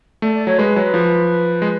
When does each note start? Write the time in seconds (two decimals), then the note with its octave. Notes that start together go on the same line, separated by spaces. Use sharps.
0.22 A3 D5
0.35 D5
0.47 F#3 C#5
0.58 G#3 B4
0.76 F#3
0.94 F3
1.62 G#3